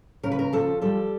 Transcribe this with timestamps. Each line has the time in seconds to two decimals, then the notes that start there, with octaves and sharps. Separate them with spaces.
0.23 C#3 A#4
0.31 B4
0.39 A#4
0.53 F3 A4
0.81 G3 A4